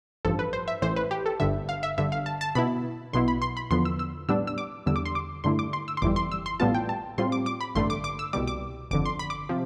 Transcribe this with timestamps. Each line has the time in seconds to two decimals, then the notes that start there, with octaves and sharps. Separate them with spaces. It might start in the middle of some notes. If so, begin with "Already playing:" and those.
0.25 A1 G2 F3 A4
0.39 B4
0.53 C5
0.68 E5
0.82 A1 A2 E3 C5
0.96 B4
1.11 G4
1.26 A4
1.40 G1 G2 D3 E5
1.69 F5
1.83 E5
1.98 G1 G2 D3 E5
2.12 F5
2.26 A5
2.41 A5
2.55 B2 B3 E4 B5
3.13 B1 B2 B3 E4 C6
3.28 B5
3.42 C6
3.57 B5
3.71 E2 D3 F3 B3 C6
3.85 E6
3.99 E6
4.29 A2 G3 B3 D4 E6
4.47 E6
4.58 D6
4.86 E2 D3 G3 E6
4.96 D6
5.06 C6
5.15 D6
5.44 G2 D3 A3 E4 C6
5.59 D6
5.73 C6
5.88 E6
5.97 C6
6.02 G1 F2 E3 G3 D6
6.16 C6
6.32 E6
6.46 C6
6.60 A1 A2 G3 B3 F4 A5
6.74 G5
6.89 A5
7.18 A2 G3 C4 F4 C6
7.32 D6
7.46 D6
7.61 B5
7.75 A1 G2 D3 A3 C6
7.90 D6
8.04 D6
8.19 E6
8.33 C2 B2 G3 D6
8.48 D6
8.91 G1 F2 D3 D6
9.06 C6
9.19 B5
9.30 D6
9.49 C3 F3